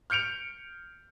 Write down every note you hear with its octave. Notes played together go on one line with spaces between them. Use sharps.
F6 G6 C#7 D7 F7